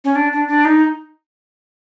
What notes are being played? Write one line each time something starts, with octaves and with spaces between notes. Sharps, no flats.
C#4
D4
D4
D4
D#4